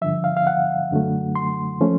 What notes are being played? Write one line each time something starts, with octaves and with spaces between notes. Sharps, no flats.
G2 D3 F3 E5
F5
F5
F#5
F#2 D3 F#3 A3
C6
F3 A3 C#4